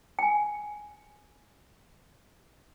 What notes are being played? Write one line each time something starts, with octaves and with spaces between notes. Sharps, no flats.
G5 G#5